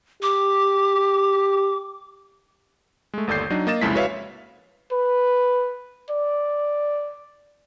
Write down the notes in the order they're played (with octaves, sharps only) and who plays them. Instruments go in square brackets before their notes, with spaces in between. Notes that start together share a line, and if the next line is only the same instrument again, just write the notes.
[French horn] G4 [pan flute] D6
[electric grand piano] G#3 A3
G1 D#2 A4 D5 G6 C7
F#3 D4 D#4 D#5
A#3 D#5 A6 E7
C2 F2 C#3 G#3 E4 B6
F#4 B4 C#5 E5 F5
[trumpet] B4
D5